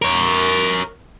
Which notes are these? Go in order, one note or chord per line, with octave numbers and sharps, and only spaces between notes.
A#4 C#5